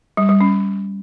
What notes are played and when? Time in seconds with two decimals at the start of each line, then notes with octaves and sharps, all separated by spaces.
0.17 G3
0.29 G3
0.41 C#4